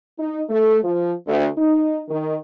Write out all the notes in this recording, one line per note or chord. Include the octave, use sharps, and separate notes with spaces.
D#4
A3
F3
D2
D#4
D#3